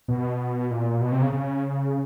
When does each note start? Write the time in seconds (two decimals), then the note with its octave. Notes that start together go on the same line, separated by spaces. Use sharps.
0.08 B2
0.71 A#2
1.01 B2
1.12 C3
1.22 C#3
1.32 C#3